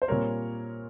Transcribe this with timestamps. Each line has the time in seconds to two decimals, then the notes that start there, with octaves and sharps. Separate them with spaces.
0.02 C5
0.08 A#2 G3 C4 A#4 C#5